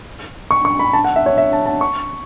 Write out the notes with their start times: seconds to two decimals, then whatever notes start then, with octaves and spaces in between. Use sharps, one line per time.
0.51 C#6
0.65 C#6
0.79 B5
0.93 A5
1.04 F#5
1.16 E5
1.26 C#5
1.38 E5
1.53 A5
1.66 A5
1.81 C#6